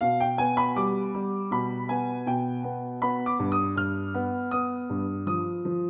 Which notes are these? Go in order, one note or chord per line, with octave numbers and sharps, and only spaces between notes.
B2 F5
G5
B3 G#5
B5
G3 D6
G3
B2 B5
B3 G#5
B2 G5
B3
B3 B5
D6
G2
D#6
G2 F6
B3
B3 D#6
G2
F3 D#6
F3